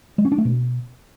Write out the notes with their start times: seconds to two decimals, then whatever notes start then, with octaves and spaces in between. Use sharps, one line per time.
0.18 G#3
0.25 C#4
0.32 D4
0.38 A3
0.45 B2